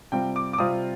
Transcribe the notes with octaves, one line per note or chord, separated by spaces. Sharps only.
C3 G3 C4 F4 G5
D6
D6
C3 G3 C4 F4 D#6